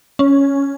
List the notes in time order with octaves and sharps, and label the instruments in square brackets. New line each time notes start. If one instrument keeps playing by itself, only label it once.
[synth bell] C#4